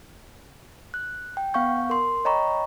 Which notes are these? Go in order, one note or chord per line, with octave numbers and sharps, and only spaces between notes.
F#6
G5
B3 F5 F#5 C#6 G6
A#4 C6
C#5 D#5 G5 A#5 B5 C#6